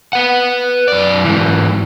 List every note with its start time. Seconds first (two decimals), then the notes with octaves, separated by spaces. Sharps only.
0.13 B4 F#5
0.88 F#2 D5
1.25 G#2 E3